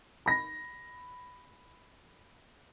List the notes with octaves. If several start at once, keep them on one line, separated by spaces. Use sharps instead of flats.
B5 A#6